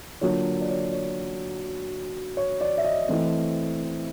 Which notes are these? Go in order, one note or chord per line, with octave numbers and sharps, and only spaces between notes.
D3 F#3 A#3 D4 F4 C#5
D5
C#5
C#5
C#5
D5
E5
D#5
E3 A3 C4